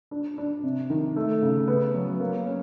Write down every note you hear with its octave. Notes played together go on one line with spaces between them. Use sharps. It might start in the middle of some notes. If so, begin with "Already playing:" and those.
D4
D4
C3
D#3
A3
C#3
B3
F#3
A#3
C#4